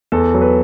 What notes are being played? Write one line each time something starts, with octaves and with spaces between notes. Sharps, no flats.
E2 A4
F#3
B4